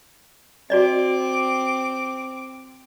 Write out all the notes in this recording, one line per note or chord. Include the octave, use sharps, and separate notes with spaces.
C4 F#4 D5 D#5 D6